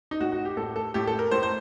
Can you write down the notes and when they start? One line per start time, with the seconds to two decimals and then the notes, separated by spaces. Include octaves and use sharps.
0.11 D#4
0.20 A2 F#4
0.32 F#4
0.45 G4
0.57 A2 A4
0.76 A4
0.94 A2 G4
1.07 A4
1.19 A#4
1.31 A2 C5
1.43 C5